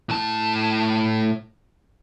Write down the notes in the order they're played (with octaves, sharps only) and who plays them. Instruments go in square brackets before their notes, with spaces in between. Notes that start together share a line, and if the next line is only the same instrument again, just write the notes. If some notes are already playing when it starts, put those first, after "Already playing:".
[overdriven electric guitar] A2 A5